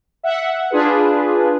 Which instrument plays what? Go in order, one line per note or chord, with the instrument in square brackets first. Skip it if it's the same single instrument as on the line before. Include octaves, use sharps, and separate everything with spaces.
[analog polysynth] E5 F#5
D4 F4 G#4 B4